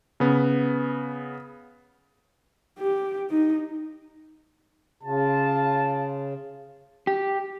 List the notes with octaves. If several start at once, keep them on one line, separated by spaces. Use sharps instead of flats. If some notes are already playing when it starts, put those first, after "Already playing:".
C#3 B3
G4
D#4
C#3 F4 A5
G4